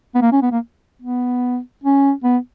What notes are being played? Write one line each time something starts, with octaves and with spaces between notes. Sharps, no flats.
B3
A#3
C#4
B3
A#3
B3
C#4
B3